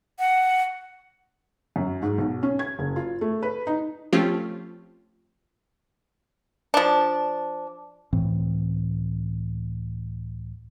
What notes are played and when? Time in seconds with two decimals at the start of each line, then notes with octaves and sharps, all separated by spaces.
0.19 F#5
1.76 F#2
2.02 G#2
2.18 B1
2.43 C#4
2.59 G#6
2.79 F#1
2.96 F4
3.21 A3
3.43 B4
3.67 D#4
4.13 F3 A3 C4 C#4 F4 G4
6.74 F3 D4
8.13 C#2 A2 E3 C4